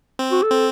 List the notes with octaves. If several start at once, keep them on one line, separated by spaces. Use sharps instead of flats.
C4
F#4
A4
C4